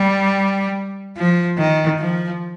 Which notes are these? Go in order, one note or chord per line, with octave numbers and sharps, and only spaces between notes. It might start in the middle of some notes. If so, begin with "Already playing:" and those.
Already playing: G3
F3
D#3
F3